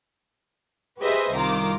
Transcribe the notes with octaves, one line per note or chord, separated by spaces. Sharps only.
G4 G#4 B4 C5 D#5 E5
C2 D#3 F4 A#5 D6